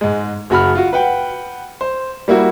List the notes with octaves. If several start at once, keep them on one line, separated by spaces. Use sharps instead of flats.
G#2 G#3
F#1 F#4 B5 F6
F4 F#4
B4 F#5 G5
C5
G3 A#3 E4 F#4